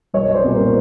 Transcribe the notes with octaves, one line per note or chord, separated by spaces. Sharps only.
B1 C#5 D#5
C5 D5
A#2 G3 B3
A#4 C5